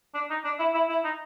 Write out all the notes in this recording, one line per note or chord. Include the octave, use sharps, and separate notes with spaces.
D4
D#4
D4
E4
E4
E4
D#4